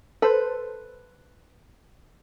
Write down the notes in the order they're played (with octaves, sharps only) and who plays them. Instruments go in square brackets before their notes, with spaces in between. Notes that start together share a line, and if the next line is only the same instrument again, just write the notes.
[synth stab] A4 C5 [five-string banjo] B4